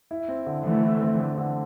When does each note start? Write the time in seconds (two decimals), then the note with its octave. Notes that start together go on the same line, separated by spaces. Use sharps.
0.11 E4
0.28 C4
0.46 D3
0.64 D3 E3 A3
0.82 E4
1.02 C4
1.19 D3
1.38 D3